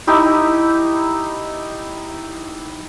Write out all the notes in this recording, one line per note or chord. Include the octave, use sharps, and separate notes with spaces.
D#4 E4 G4 E5